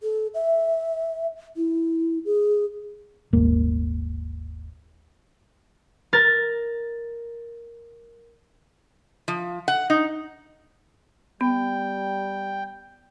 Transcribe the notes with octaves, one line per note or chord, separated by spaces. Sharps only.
A4
E5
E4
G#4
D#1 G#1 A#3
A#4 A6
F3
F#5
D#4
G3 B3 G5